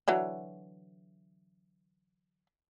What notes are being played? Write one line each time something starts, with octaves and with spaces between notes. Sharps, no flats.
D3 E3 F#3